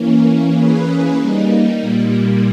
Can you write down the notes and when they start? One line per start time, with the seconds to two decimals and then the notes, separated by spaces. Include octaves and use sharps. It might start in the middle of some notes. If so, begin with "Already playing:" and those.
Already playing: E3 A#3 C#4
0.52 E3 A#3 C#4 G#4 B4
1.17 G3 A#3 D#4
1.81 A#2 G3 A#3